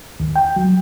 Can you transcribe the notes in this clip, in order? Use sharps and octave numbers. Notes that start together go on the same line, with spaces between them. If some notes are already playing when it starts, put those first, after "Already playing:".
D#2
G5
F#3